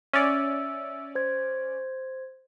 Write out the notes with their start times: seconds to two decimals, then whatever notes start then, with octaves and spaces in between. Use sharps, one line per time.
0.13 C#4 D5 E5 E6
1.15 C5 G#6